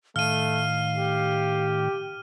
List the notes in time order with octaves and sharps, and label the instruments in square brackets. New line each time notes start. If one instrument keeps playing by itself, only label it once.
[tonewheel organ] A2 D#3 [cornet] A3 [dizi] F5 [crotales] F6 D#7
[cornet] G4